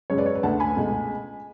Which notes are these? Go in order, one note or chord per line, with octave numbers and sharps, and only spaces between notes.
F#2 C#3 G#3 C#5
B4 D5
C#5
B4
D2 D3 A3 F#5 A5
G#5 B5
C#2 B2 A3